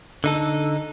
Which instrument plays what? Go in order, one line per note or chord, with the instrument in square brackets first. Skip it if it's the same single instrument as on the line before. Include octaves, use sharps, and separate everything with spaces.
[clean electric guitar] D3 D#4 A4